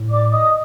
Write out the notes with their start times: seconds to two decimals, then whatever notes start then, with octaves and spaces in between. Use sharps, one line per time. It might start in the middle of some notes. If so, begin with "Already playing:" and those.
Already playing: A2
0.10 D5 D6
0.31 D#5 D#6